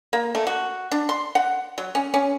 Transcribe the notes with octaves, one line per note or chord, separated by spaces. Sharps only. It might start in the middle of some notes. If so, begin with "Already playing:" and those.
A#3
A3
F#4
D4
C6
F#5
F#3
C#4
C#4